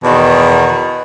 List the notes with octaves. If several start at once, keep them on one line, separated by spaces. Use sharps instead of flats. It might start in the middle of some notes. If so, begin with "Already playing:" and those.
E2 B2 D#3